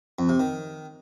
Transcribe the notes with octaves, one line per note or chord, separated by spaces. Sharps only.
F2
C3
D#3